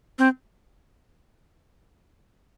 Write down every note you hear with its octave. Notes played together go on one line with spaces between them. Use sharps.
C4